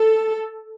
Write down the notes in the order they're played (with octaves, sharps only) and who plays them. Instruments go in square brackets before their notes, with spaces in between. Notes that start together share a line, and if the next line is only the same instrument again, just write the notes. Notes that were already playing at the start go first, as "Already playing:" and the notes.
Already playing: [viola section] A4